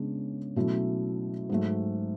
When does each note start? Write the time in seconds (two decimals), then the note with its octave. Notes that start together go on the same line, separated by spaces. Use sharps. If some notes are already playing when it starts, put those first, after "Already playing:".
Already playing: C#3 G#3 B3 D4
0.56 B2 F#3 A3 C#4 E4
1.50 G#2 F#3 A3